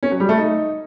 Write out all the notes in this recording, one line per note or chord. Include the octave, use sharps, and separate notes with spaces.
C#4
F#3
G3
A3
D#4